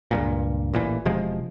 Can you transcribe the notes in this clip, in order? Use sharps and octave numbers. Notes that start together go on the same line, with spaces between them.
C#2 G2 A#2
A1 A#2 E3
E1 C3 F3 G#3